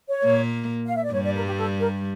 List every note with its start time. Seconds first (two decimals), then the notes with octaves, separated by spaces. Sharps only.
0.09 C#5
0.23 A#2 A#3
0.86 F5
0.96 E5
1.04 D5
1.13 G2 G3 C#5
1.24 D5
1.35 A#4
1.46 G4
1.58 A4
1.80 A#4